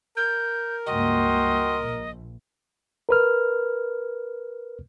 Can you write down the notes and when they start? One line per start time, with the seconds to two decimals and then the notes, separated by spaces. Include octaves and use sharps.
0.17 A#4 G6
0.86 C#2 G2 A#3 F#4 D#5 G5 C6
1.79 A#1
3.09 A#4 B4 F6